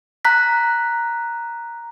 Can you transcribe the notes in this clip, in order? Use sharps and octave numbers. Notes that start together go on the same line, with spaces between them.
A#5 F#6 B6